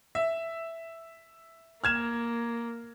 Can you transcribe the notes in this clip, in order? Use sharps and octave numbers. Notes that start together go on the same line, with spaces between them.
E5
A#3 F6 G#6 E7